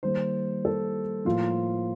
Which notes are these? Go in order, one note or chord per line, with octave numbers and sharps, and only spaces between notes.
D#3 G3 A#3 C5
A4
A2 F3 A#3 F4